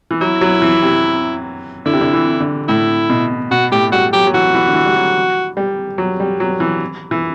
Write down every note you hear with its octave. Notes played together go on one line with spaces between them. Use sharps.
E3
F#3 E4
F#3
E3
C3
D3 E4
C3
D3
E3
D3
A2 E4
B2
B2 F#4
A2 G4
G3 F#4
F#3 G4
F#3
E3 F#4
E3
D3
E3
G3
F#3
G3
F#3
G3
F#3
E3
E3